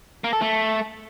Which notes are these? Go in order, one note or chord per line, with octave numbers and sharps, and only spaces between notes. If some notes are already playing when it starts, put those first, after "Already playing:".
A#3
A4
A3